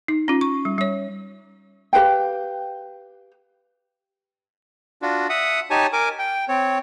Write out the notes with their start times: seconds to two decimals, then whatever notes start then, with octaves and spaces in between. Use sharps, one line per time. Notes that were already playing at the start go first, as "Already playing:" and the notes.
0.08 D#4
0.28 C#4 F4
0.41 C#6
0.65 G3
0.78 G3 C#5
1.93 G4 B4 F5 G5
5.02 D4 F4 F#4
5.29 E5 F#5 D#6
5.71 D#4 G4 C#5 G#5 A5
5.93 A#4 G#5 D6
6.19 G5
6.49 C4 C#5